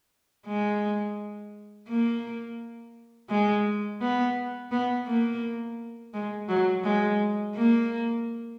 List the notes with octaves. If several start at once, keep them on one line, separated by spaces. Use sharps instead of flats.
G#3
A#3
G#3
B3
B3
A#3
G#3
F#3
G#3
A#3